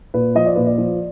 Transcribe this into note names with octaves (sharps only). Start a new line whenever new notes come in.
A#2 B4
F3 D#5
D5
A#2 B4
D5
F3